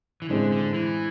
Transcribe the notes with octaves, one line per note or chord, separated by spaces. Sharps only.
E3
A2 D3 G#3 C4 G#4
D3
E3